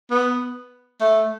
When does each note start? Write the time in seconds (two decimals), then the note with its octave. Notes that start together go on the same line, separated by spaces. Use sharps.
0.11 B3
1.01 A3